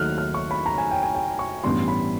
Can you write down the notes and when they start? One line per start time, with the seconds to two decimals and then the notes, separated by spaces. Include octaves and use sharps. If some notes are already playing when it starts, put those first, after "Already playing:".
Already playing: D#2 D#3 F#3 A3 F6 F#6
0.18 F6
0.34 C#6
0.51 B5
0.66 A#5
0.78 G#5
0.91 G5
1.03 G#5
1.15 G5
1.39 C#6
1.63 A1 G2 E3 G3 B3 C6
1.88 B5